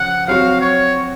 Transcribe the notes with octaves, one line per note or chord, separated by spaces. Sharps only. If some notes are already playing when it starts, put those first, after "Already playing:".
Already playing: C#3 F3 F#5
F#3 C4 F#4 F5
C#5